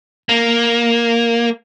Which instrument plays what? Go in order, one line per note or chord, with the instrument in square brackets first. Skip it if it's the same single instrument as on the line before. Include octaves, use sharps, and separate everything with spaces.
[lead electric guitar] A#3